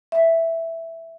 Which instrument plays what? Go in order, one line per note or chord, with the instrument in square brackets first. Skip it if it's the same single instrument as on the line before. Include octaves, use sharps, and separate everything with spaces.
[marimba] E5